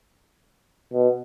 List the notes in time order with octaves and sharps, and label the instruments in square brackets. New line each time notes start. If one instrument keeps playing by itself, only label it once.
[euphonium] B2